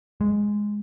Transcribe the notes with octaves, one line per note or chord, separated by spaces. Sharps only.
G#3